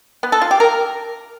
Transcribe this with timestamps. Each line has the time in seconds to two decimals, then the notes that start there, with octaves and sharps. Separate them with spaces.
0.23 B3
0.32 A4
0.42 F4
0.51 G4
0.60 A#4